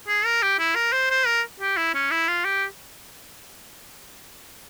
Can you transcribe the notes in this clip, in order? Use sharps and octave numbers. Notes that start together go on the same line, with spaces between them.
G#4
A#4
G4
E4
A#4
C5
C5
A#4
G4
E4
C#4
E4
F4
G4